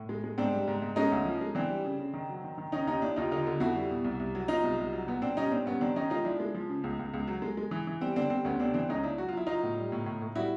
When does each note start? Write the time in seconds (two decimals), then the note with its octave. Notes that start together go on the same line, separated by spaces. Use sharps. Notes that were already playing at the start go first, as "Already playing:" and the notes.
Already playing: A2
0.09 G#3
0.24 G#3
0.38 G#2 C4 D4
0.53 G3
0.68 G#2
0.82 G#2
0.96 G#3 C#4 D#4
1.12 D2
1.25 F3
1.41 G#3
1.55 E3 C4 D4
1.69 G3
1.85 C#3
1.99 C#3
2.14 D#3
2.29 F#3
2.44 D#3
2.58 D#3
2.72 D#3 C#4 D#4
2.87 D#2 C#4 D#4
3.02 D#2 D4 E4
3.16 D#2 D#4 F4
3.31 D3 D#4 F4
3.47 D3
3.60 F2 E4 F#4
3.76 G3
3.90 B2
4.04 C2
4.20 C2
4.35 F#3
4.48 F#3 D#4 F4
4.64 C2
4.78 C2
4.93 F#3
5.07 A#2 B3
5.22 A#2 C4 D4
5.37 G3 C#4 D#4
5.51 A#2 C4 D4
5.66 G2 B3 C#4
5.81 D#3 C4 D4
5.96 D#3 C#4 D#4
6.10 G#3 D#4 F4
6.25 F3 D4 E4
6.40 G#3
6.54 F3
6.69 C#3
6.84 C#2
6.99 C#2
7.14 C#2
7.27 F#3
7.42 G#3
7.57 G#3
7.71 E3
7.87 E3
8.01 G3 C4
8.16 D3 C4 D4
8.30 G3 C4
8.45 D2 B3 C#4
8.60 C3 C4 D4
8.74 E3 C4 D4
8.89 C#2 C#4 D#4
9.03 C#2 D4 E4
9.18 F#3 F#4
9.28 F4
9.33 F#3 E4
9.47 F#3 D#4 F4
9.63 A2
9.78 G3
9.92 A2
10.06 A2
10.22 A2
10.36 G3 E4 F#4